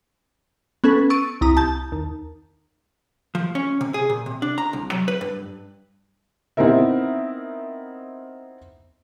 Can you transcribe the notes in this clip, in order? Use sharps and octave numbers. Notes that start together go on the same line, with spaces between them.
B3 C#4 A4 B4
C#6 E6 A6 D7 D#7
C2 E4 A#5 D#6
A5 G6
D#2
F3
C#4
C3
G#4
A#2
C3
D4
A#5
C2
F#3
B4
G2
B3 C4 D#4 E4 A#4 E5